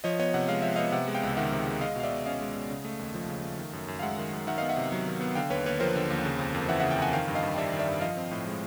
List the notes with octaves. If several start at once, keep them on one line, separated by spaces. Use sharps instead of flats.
F3 C#5 D#5
B3 C#5 D#5
C3 F#5
G#3 F5
F3 E5
B3 D#5 F5
C3 E5 F#5
G#3
F5 G5
C#2
D#3 E5 F#5
C3
G#3
G#3 D#5 F5
B2 F5
D5 E5
B2
C#4 D#5 F5
G#3
B2
C#3
A3
D#2
F3
C#3
A3
D#3
F#2
F#2
F5
G#3 E5 F#5
D#3
F#2
D#3 E5 F#5
B3 D#5 F5
E5 F#5
C3
F#3
D#3
B3
D3 F5 G5
D#2 B4 C#5
D#2 B4 C#5
F3 A#4 C5
D3
D#2
C#3
F2
F2
E3 E5 F#5
C#3 E5 F#5
G5
F2 F#5 G#5
D#3 F5 G5
G2
D#5 F5
G2
G3 D5 E5
D#3
D5 E5
G2
F3 D#5 F5
C4
A2
G#3